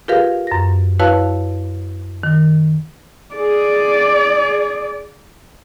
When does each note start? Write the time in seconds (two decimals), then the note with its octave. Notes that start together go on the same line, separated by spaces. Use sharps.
0.08 F4 G4 G#4 A#4 B4 F5
0.47 F#2 A#6
0.99 E4 F#4 B4 C#5 F5 A5
2.23 D#3
3.35 G#4 D5